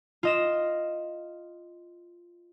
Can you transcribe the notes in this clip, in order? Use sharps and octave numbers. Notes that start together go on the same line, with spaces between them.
F4 D#5 E7